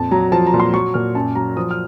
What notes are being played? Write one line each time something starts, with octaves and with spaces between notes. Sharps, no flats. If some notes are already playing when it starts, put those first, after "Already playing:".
Already playing: F2 A#2 A5
F#3 A#5
F3 A5
A#5
A#2
C6
F#3 C#6
A#2 F6
F#2 A5
F#3 A#5
F3 D#6
F6